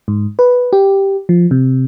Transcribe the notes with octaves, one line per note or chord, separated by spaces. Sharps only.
G#2
B4
G4
F3
C3